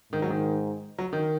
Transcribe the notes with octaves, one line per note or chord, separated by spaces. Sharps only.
G#2 D#3
F#3
D#3
F#3
D#3